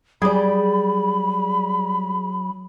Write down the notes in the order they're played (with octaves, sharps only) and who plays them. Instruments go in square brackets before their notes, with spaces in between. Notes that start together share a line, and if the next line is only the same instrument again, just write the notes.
[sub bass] F#3 [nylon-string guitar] G3 D5 [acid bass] G#4 [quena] B5